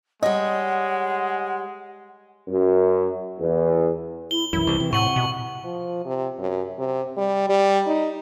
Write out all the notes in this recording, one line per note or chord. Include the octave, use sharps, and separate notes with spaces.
G3 G#3 C#5 D#5 F#5
F#2
E2
E4 G7
B1 F#2 E3 E4
C2
C3 E3
A2 F#5 C#6 F#7
B2
F3
C3
F#2
C3
G3
G3
D#4